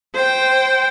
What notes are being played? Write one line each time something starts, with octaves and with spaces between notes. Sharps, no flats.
C5 G5